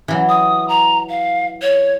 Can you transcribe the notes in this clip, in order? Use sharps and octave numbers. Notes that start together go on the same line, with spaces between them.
E3 F#3
D#6
A#5
F5
C#5